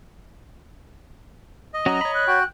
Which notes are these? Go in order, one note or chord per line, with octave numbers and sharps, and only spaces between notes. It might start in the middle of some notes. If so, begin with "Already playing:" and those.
D#5
F#3 C#4 F#4 A#5
C#5 B5
F#6
F#4 G5